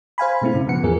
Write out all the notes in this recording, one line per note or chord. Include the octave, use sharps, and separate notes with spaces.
C5 F5 G#5 B5
B2 G#3 A3 C4 E4
G#2 C#3
G#2 C#3 F3 B3 F#5 C#7
E2 G#2 F3 G#4 A#4